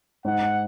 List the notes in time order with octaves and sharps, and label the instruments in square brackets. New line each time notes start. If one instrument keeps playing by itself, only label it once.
[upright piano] G#2 [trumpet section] F#5